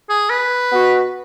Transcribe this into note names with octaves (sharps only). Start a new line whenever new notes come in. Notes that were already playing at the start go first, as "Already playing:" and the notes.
G#4
B4
B2 B3 F#4